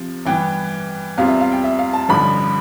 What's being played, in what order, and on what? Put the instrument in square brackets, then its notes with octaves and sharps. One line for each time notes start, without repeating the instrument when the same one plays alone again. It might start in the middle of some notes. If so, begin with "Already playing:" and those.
Already playing: [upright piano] C3 F3
[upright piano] G2 E3 B3 [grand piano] G5
[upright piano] E2 C3 G3 C4 F4 [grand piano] F5
[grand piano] E5
F5
G5
E5
F5
A5
[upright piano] A1 G2 D3 F3 [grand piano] B5